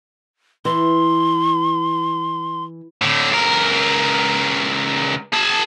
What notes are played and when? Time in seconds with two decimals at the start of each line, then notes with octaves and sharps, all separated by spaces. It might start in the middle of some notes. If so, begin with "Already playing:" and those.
0.65 E3 C6
3.02 A2 D3
3.30 C#2 A#4
5.33 G#4 A5